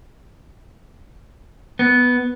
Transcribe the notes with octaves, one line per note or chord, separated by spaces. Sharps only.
B3